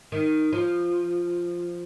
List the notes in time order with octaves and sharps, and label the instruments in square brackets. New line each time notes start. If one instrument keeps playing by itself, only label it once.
[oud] D#3
F3